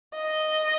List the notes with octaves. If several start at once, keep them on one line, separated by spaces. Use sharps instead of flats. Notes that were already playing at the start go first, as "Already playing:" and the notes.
D#5